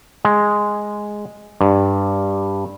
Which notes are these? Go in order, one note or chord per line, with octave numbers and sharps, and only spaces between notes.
G#3
G2